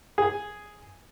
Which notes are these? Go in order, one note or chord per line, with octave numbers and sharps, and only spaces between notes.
G#4